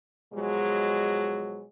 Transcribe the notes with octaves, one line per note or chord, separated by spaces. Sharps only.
B2 F3 F#3 G#3